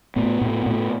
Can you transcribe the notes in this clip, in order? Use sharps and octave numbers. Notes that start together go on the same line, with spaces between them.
A2 B3
A2
A2